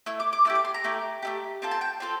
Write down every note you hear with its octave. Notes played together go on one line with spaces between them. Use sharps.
A3 E4 E6
D6
D6
A3 E4 G4 E6
D6
C6
A#5
A3 E4 G4
A3 E4 G4
C4 F4 A4
A5
G5
C4 F4 A4